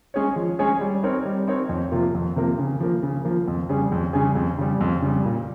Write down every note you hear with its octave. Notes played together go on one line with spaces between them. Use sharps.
G#3 C#4 G#4 C#5
F3
G#3 C#4 G#4 C#5
G3
C4 D#4 A#4 C#5
G3
C4 D#4 A#4 C#5
F2
C3 F3 A#3 F4
F2
C3 F3 A#3 F4
C#3
F3 A#3
C#3
F3 A#3
F2
C#3 G3 C#4 G#4
F2
C#3 G3 C#4 G#4
F2
C#3 G3
F2
C#3 G3
A#2